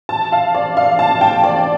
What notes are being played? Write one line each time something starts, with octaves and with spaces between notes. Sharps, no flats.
A5
F5
D5
F5
A5
G5
D5